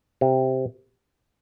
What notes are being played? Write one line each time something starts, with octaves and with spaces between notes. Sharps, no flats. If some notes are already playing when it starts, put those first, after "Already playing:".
C3